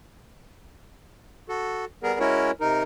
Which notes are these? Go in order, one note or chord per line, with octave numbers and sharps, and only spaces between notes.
F#4 A4
G3 B3 G#4 A#4
G#3 C#4 E4 F#4 A#4 C#5
C3 D#4 A#4